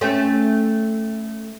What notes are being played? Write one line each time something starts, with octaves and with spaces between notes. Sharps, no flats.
A3 C4 C#4